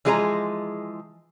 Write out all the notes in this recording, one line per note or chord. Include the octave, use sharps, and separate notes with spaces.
E3 F3 G#3 G#4 B4 A#5